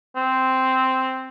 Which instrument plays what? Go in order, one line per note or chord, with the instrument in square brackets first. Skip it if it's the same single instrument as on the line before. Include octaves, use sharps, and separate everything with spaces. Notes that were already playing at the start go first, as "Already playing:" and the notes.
[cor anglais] C4